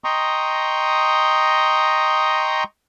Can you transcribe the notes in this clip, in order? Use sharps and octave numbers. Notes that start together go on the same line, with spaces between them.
D#5 G5 A#5 C6 C#6 D#6